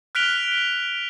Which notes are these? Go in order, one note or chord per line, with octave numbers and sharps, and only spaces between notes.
F6 F#6 B6 D7 F7 G7